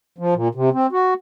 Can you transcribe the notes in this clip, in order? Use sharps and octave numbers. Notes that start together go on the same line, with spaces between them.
F3
A#2
C3
C4
F#4